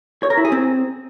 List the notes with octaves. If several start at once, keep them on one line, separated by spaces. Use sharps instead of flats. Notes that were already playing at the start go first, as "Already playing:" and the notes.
C#5
A#4
E4
G#4
C4